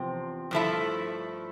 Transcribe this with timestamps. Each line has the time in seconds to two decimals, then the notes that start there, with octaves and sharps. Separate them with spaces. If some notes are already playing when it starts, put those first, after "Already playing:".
Already playing: E2 C3 F3 C4
0.51 G2 F3 A3 E4